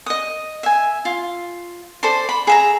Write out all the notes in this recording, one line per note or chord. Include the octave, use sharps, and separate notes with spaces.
D#5 D#6
E5 G#5
F4
A4 C5 D5 C6
B5
G#4 E5 A#5